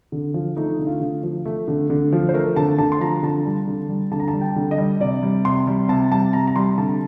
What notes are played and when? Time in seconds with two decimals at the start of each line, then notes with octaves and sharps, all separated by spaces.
0.12 D3
0.34 F3
0.57 A3 D#4
0.79 D3
0.87 F4
1.01 D3
1.23 F3
1.46 A3
1.68 D3
1.90 D3
2.13 F3
2.29 C5
2.34 A3 A#4
2.56 D3 A5
2.78 D3 A5
2.92 C6
3.01 F3 A#5
3.23 D3 A5
3.45 G3
3.67 D3
3.89 G3
4.11 D3 A5
4.20 A#5
4.28 A5
4.33 G3
4.41 G5
4.56 D3
4.71 D#5
4.78 G3
5.00 C3 D5
5.23 G3
5.45 C3 C6
5.67 G3
5.89 C3 A5
6.12 G3 A5
6.33 C3 A#5
6.47 A#5
6.56 G3 C6
6.78 D3 A5